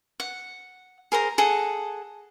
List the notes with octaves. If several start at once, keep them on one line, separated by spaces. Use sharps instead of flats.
F#5
G#4 A#4 C5 A#5
G#4 A4 F#5